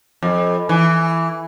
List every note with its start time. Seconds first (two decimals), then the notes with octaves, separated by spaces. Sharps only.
0.23 F2
0.69 E3